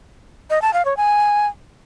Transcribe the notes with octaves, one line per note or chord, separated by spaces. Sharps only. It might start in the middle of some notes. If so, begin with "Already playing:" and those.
D#5
A5
F5
C#5
G#5